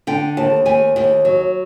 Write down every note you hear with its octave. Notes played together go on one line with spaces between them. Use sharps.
D3 G5
D#2 A5
D#2 G#5
D#2
F#3